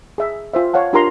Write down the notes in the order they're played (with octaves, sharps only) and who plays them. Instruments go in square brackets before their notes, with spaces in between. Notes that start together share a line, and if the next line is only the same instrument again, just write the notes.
[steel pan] G#4 E5
F4 C5 E5
C#5 F5 F#5 A5
D4 F4 G4 A#4 A#5 C6